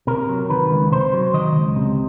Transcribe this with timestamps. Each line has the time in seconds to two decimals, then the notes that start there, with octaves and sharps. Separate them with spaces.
0.07 C3 A#4
0.29 F#3
0.49 D#3 B4
0.71 C#2
0.92 C3 C5
1.13 F#3
1.34 D#3 D#5
1.55 C#2
1.76 C3